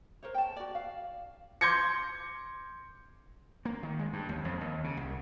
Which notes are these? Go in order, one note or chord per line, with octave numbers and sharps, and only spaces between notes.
A#4 C5 C#5
G5 A5
F#4 D5
F5
C6 D6 G6 G#6 A#6 C#7
A#3
D#3
G#3
G2
D#2
F2
D#2
C#3
C2